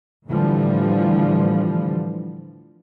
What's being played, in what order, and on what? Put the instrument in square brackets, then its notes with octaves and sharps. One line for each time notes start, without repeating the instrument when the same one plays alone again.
[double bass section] A2 D3 E3 F3 G3